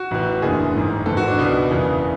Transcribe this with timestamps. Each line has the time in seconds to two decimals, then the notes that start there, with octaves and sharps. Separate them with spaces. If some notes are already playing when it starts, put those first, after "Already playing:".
Already playing: F#4
0.11 A1 A2 E3
0.42 F#1 E2 D3 G#4
0.75 A1 G#2 E3
1.06 G#1 G#2 E3 A4
1.17 F#4
1.28 D4
1.39 C#2 B2
1.71 F#1 E2 C#3 E3